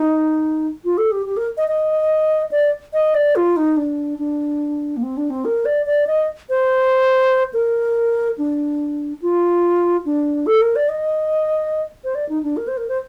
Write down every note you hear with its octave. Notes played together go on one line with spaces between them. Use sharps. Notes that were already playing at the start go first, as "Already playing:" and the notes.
Already playing: D#4
F4
A4
G4
G4
A#4
D#5
D#5
D5
D#5
D5
F4
D#4
D4
D4
A#3
C4
D4
C4
A#4
D5
D5
D#5
C5
A#4
D4
F4
D4
A4
A#4
D5
D#5
C5
D5
D#4
D4
A#4
C5
A#4
C5